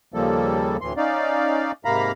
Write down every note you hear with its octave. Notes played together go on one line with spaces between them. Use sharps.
D#2 C#3 F3 G3 A#3 A4
D2 A2 E3 C6
C#4 D#4 D5 F5
G#2 C3 A#3 F5 A#5 B5